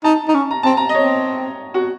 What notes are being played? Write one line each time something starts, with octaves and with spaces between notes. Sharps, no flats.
D#4 A5
D#4
C#4
A#5
C4 A5
A#5
D#5
C4 C#5
F#4